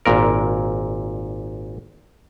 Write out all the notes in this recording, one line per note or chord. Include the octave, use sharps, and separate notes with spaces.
G#1 A#2 A#4